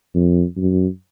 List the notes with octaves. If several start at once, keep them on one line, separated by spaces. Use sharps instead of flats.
F2
F#2